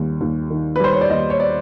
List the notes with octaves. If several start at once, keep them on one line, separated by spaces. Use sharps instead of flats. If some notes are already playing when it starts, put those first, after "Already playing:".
Already playing: D#2 D#3 G3
D#2
D#3
B4
G3 C5
C#5
D5
D#2 D#5
C#5
D5